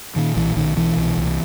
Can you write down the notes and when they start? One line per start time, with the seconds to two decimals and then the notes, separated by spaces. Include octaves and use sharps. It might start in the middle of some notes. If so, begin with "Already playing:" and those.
0.16 A#2 D#3
0.36 B1 E3
0.56 B1 D#3
0.77 B2 E3
0.97 C2
1.17 C2